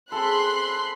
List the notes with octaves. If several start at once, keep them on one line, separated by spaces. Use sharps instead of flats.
C4 G#4 A4 B5 C6 F#6